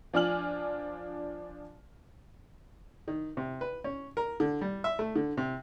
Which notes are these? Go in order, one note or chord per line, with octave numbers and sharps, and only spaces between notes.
F3 D4 G#5 F6 F#7
D#3
C3
B4
C#4
A#4
D3
G3
E5
A3
D3
C3